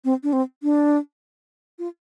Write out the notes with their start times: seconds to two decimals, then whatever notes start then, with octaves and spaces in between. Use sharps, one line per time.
0.05 C4
0.23 D4
0.33 C4
0.63 D4
1.79 F4